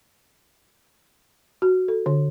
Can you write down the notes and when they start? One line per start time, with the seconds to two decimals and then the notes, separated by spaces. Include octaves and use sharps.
1.62 F#4
1.88 A4
2.06 D3